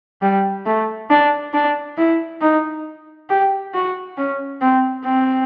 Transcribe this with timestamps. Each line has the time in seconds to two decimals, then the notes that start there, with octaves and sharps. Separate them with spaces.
0.22 G3
0.66 A3
1.10 D4
1.54 D4
1.97 E4
2.41 D#4
3.30 G4
3.74 F#4
4.18 C#4
4.61 C4
5.05 C4